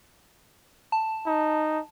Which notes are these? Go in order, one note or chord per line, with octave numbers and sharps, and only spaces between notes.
A5
D#4